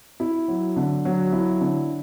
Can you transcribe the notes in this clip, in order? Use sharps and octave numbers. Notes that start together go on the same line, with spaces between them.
E4
F#3
D3
F#3
E4
D3